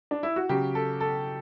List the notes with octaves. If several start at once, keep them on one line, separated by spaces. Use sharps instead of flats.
D4
E4
F#4
C#3 F#3 G4
A4
A4